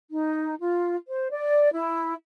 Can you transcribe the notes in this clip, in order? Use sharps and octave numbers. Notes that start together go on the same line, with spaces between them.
D#4
F4
C5
D5
E4